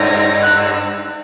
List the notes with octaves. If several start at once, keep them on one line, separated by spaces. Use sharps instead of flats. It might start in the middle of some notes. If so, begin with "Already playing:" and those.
Already playing: G2 A#6
F#6
E6